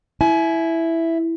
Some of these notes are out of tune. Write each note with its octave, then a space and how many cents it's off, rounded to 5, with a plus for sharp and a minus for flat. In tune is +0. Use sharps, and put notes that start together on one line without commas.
E4 +0 G#5 +35